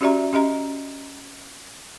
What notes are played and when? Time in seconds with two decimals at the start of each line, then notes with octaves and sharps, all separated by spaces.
0.01 C#4 F#4 G4 D5 E5 A#5
0.33 C#4 G4 D#5 A#5